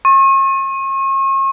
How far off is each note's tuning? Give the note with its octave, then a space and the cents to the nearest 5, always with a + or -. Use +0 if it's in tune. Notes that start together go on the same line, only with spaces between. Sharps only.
C#6 -40